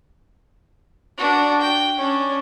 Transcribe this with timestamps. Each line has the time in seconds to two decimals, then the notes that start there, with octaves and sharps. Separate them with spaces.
1.17 D4 F#4
1.61 G5
1.97 C#4 D4